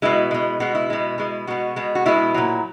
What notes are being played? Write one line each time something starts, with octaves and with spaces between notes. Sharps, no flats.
B2 G#3 E4
B2 G#3
B2 G#3 F#4
E4
B2 G#3
B2 G#3
B2 G#3 F#4
B2 G#3
F#4
B2 G#3 E4
A#2 F#3